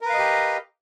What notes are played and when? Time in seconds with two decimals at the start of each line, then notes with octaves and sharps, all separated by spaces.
0.01 A#4
0.05 B4
0.10 F5
0.14 D#5
0.18 G4